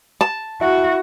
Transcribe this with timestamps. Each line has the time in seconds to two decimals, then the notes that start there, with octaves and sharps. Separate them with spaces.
0.21 A5
0.61 E4 F#4